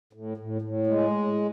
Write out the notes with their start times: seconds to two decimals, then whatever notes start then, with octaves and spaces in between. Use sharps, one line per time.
0.13 A2
0.37 A2
0.62 A2
0.87 G#3